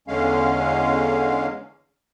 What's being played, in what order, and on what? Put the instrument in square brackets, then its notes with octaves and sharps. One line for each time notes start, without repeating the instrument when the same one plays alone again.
[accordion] E2 D3 G#3 C#4 F5